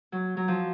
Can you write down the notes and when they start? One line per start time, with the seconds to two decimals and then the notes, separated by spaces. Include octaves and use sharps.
0.12 F#3
0.37 F#3
0.48 F3